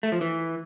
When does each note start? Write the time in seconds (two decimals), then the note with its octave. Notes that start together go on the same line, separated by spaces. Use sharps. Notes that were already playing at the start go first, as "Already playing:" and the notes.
0.03 A3
0.12 F3
0.21 E3